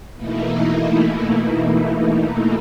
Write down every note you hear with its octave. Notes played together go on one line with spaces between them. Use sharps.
B2 E3 A3 A#3 D#4 E4